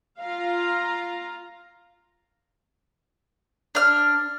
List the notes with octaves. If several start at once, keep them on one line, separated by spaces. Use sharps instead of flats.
F4 F5 A#5
D4 F6